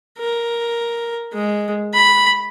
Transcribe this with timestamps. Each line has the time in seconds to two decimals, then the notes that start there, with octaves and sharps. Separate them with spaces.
0.18 A#4
1.33 G#3
1.94 B5